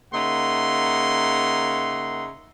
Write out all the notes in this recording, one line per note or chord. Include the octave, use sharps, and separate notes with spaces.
C#3 A#3 D#4 E5 F#5 C6